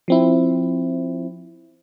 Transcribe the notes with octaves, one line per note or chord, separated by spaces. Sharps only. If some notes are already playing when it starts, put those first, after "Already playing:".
F3 C4 E4